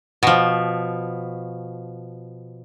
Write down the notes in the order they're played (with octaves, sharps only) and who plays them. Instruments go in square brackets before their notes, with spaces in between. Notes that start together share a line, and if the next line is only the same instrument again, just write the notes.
[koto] B2 F3